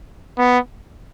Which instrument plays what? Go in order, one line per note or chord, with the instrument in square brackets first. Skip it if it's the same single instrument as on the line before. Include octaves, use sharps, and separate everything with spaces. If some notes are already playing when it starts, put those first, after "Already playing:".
[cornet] B3